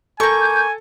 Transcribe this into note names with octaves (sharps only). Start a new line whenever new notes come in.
A#3 A4 G#5 C#6 G6